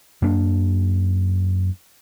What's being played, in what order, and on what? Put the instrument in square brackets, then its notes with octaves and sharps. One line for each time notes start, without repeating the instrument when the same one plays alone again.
[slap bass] F#2 A#3 D4